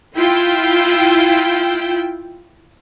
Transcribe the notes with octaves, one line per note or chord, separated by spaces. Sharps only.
E4 F4 G5